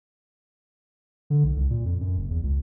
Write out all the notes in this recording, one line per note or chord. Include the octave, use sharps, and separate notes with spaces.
D3
B1
C2
A#2
F2
F#2
F#1
E2
C#2